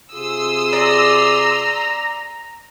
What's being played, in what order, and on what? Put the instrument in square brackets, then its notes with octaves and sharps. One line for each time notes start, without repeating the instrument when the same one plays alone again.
[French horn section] C3 F4 G#4 [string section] C6 D#6 E6
[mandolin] D5 [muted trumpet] A#5